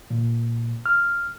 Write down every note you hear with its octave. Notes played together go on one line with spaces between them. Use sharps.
A#2
F6